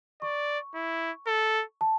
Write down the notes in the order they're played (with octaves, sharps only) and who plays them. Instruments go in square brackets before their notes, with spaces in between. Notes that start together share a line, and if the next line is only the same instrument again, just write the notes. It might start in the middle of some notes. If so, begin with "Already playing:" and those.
[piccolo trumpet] D5 [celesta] C#6
[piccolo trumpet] E4
A4
[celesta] A5